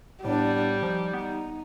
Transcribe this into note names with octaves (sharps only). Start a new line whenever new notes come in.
A2 G3 B3 D4
F3 D#4
B3 D#4